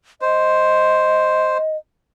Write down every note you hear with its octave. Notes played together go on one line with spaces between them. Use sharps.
C5 D#5